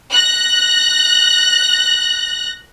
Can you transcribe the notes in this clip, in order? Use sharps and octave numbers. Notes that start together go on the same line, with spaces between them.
F#6 A#6